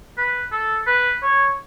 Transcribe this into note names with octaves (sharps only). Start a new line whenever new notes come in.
B4
A4
B4
C#5